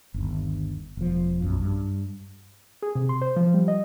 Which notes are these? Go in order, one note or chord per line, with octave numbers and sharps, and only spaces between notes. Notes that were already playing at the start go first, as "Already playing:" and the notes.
G1 D#2
E1 F3
B1 F#2
G2
G#4
C3
C6
C5
F3
G3
D#5